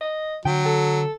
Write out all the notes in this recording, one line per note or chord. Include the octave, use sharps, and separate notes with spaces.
D#5
D3 F#3 G5
A4